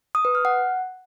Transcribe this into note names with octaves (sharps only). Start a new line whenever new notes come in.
D#6
B4
F6
F#5